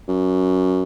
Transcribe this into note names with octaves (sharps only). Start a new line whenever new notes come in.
F#2